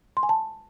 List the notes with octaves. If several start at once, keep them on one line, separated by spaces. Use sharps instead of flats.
C6
G#5
A5